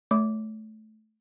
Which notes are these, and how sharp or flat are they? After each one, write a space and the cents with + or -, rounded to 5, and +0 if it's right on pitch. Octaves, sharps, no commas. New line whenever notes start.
A3 -15 C#5 +30 D6 -10